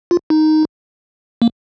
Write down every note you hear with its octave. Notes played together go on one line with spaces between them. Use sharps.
F4
D#4
A#3